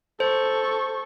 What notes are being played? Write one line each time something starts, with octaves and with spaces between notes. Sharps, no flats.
A4 C5 C#6